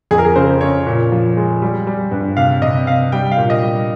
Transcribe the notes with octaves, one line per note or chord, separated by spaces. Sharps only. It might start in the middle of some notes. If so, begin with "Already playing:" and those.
F2 G#4
A#4
G#4
C#3 C5
C#3 C#5
A#2
F3
G#3
G3
G3
G2
C3 F5
C3 D#5
C3 F5
G3 G5
F5
A#2
D#5
G3